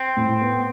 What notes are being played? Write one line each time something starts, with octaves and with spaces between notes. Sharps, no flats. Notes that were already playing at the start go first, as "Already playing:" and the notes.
Already playing: C4
A2
B3